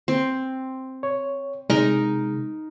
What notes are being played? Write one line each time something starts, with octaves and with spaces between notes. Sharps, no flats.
C4
C#5
C3 G#3 D#4 A#4 D#5